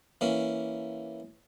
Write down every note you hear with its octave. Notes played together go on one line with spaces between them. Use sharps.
E3 A#3 C#4